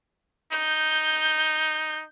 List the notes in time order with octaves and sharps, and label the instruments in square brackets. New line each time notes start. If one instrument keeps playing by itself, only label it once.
[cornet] D#4 [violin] G6